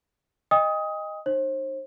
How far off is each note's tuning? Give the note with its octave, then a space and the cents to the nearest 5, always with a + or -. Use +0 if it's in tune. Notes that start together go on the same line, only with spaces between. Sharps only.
D#5 +0 G5 +45 D#6 +20
D#4 -30 C5 +40